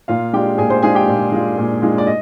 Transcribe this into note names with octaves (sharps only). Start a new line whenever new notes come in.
A#2 F4 F5
G#3 D4 F4 G4 G5
A#2 G#4 G#5
C5 C6
G#3 D4 F4 G#4 G#5
G4 G5
A#2
G#3 D4 F4
A#2
G#3 D4 F4
D5
D#5